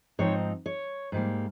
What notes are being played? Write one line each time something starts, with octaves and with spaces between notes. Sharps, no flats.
G#2 F3 C4 D#4 C#5
C#5
G#2 G3 A#3